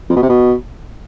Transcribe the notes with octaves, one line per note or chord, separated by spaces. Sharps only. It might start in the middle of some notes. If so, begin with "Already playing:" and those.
F2
B2
C3
B2